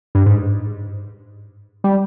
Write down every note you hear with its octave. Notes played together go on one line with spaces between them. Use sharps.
G2
G#2
G3